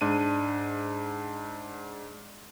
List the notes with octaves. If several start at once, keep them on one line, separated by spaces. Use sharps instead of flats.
G#2 D4 D#7